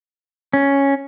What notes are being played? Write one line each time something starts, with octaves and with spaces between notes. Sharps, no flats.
C#4